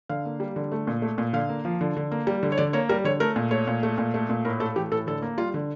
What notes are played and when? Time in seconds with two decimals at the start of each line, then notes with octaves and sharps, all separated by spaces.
0.09 D3 F5
0.25 A#3
0.40 G3
0.56 D3
0.72 A3
0.87 A#2
1.02 A3
1.18 A#2
1.33 D3 F5
1.49 A#3
1.65 F3
1.81 D3
1.97 D3
2.12 A#3
2.27 G3
2.43 D3
2.52 C#5
2.58 D3 D5
2.73 A#3 C#5
2.89 G3 A#4
3.04 D3 C#5
3.20 A3 A#4
3.36 A#2
3.51 A3 C#5
3.67 A#2
3.83 A3
3.98 A#2
4.14 A3
4.29 A#2
4.45 A2 A#4
4.60 A3 A4
4.76 E3 G4
4.92 A2 A4
5.07 D3 A4
5.22 A#3
5.38 G3 F4
5.54 D3